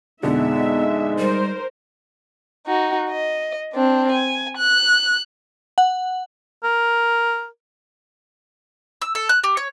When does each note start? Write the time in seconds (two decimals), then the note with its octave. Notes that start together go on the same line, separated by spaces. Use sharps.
0.23 F2 B2 D3 G#3 B3 D#4 E5
1.18 G3 A#4 C5
2.67 D#4 F#4
3.10 D#5
3.73 C4 D4
4.12 G#5
4.58 F#6
5.78 F#5
6.64 A#4
9.02 E6
9.15 A4
9.29 F#6
9.44 G4
9.57 C#5